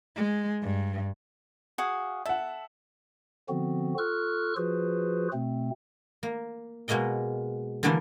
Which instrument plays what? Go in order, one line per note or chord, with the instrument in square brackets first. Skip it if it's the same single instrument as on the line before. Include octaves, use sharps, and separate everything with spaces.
[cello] G#3
G2
[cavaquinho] F#4 G#4 F5
[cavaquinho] A4 [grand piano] E5 F#5
[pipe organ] D3 F3 B3 C4 F#4
F4 A4 C#6 F6 F#6
F3 F4 F#4 G#4 B4 C5
B2 A3 C4
[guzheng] A#3
B2 G#3 A#3 D#5 G5
D3 E3 G3 A3 A#3 D4